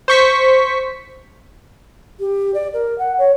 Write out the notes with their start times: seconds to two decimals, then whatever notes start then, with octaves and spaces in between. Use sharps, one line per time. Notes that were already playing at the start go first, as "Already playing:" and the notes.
0.08 C5 C#6 B6
2.20 G4
2.54 D5
2.73 A#4
2.98 F#5
3.18 C#5